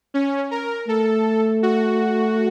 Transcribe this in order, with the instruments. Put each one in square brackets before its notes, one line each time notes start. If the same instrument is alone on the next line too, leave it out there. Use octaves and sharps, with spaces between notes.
[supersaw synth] C#4
A#4
[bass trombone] A3 [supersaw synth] A4
[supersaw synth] F#4